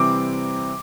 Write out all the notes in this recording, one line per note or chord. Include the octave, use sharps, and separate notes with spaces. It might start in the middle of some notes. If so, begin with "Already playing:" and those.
Already playing: C3 E3 G3 C4 D6